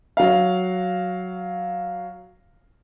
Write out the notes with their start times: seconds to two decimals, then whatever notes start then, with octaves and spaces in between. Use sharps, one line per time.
0.17 F#3 F5